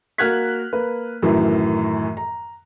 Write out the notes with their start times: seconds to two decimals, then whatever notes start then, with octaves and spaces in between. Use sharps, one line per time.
0.18 A#3 F#4 F6 F#6 G#6 B6
0.73 A#3 B4
1.23 F#2 A2 D#3 E3
2.17 A#5